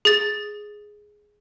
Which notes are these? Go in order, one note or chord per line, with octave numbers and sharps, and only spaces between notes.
G#4 A6